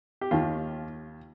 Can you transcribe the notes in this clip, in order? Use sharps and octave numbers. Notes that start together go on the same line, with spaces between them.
G4
D#2 D#3 F4